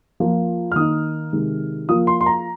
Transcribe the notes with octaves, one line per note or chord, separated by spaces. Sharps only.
F3 A#3 F4
F6
D#3 A#3 D#4 D#6
C3 D#3 G#3
F3 A#3 F4 D#6
C6
C6
A#5